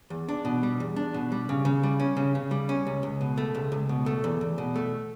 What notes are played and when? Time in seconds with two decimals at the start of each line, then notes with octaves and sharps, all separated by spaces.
0.10 E2
0.29 D4
0.45 B2
0.63 G3
0.80 E2
0.96 D4
1.14 B2
1.32 G3
1.49 C#3
1.65 C#3
1.83 G3
2.00 C#4
2.17 C#3
2.35 C#3
2.51 G3
2.69 C#4
2.87 C#2
3.03 C#2
3.21 B2
3.37 A3
3.55 C#2
3.72 C#2
3.89 B2
4.06 A3
4.24 E2
4.41 E2
4.58 B2
4.76 A3